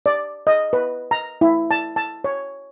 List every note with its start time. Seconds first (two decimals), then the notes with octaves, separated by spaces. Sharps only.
0.06 D5
0.47 D#5
0.73 B4
1.11 A#5
1.41 E4
1.71 A5
1.96 A5
2.24 C#5